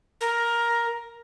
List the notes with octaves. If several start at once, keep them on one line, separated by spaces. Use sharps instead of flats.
A#4